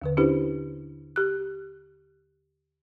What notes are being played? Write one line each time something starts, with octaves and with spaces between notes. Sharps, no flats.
D#2 D3 B4
C#4 D4 E4 G4 B4 C5
G4 F#6